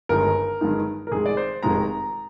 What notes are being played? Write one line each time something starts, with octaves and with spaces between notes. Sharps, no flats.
G1 G2 D#3 G#3 D#4 A#4
G1 G2 D#3 G#3 D#4
A#4
F1 F2 D#3 G#3 G#4
D5
C5
F1 F2 D#3 G#3 A#5